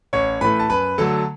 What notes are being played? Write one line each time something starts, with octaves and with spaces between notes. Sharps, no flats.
A1 C#5 C#6
A2 E3 A3 B4 B5
A5
F#2 B4 B5
D3 F#3 A3 A4 A5